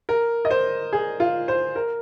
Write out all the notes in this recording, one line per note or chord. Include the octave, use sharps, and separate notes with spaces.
A#4
D#5
C5
G#4
F4
C5
A#4